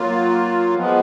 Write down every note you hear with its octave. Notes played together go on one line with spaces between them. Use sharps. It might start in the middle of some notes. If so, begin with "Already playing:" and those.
Already playing: F#3 A#3 F4
F3 G#3 B3